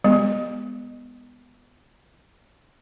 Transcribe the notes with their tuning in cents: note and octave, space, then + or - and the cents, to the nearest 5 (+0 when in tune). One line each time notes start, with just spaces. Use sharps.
G#3 -25 B3 +0